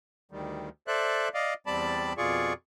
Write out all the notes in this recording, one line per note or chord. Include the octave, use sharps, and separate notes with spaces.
D2 D#3 G3
A4 C5 D5 E5 F#6
D5 D#5 F5
E2 G3 C4 D5 A5 B5
F2 B2 F4 G#4 D5 C#6